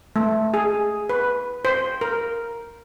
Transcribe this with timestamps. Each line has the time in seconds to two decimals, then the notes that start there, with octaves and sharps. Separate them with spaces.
0.16 A3
0.54 G#4
1.09 B4
1.65 C5
2.01 A#4